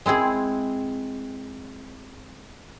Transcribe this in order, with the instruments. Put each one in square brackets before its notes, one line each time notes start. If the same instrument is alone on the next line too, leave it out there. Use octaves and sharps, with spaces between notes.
[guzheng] G#3 C4 E4 G#4